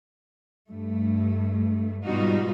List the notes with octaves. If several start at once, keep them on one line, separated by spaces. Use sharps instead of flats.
G2 A3
G#2 B2 G3 D#4 F4 F#4